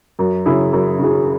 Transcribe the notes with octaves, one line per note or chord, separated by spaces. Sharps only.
F#2
C#3 F#3 E4 G#4
F#2
C#3 F#3 E4 G#4